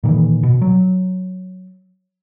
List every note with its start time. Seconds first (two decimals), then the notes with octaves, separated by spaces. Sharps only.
0.03 A#2 D#3 E3
0.43 B2
0.62 F#3